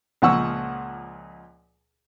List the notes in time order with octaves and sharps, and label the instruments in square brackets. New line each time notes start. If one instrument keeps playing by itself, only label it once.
[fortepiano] C#2 A#2 F3 F#5 C#6 E6